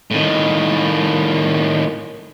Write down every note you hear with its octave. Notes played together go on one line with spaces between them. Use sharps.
A2 D#3